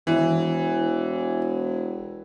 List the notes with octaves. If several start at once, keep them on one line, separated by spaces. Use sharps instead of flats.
E1 E3